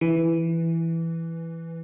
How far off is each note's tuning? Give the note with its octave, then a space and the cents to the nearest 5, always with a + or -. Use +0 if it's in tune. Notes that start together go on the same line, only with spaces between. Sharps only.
E3 +5